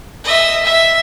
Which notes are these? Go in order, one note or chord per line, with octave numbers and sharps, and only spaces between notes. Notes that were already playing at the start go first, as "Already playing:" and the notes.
D#5 E5
E5